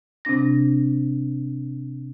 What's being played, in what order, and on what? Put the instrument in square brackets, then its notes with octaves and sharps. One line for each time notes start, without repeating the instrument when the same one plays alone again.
[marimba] C3 C4 D4 A#6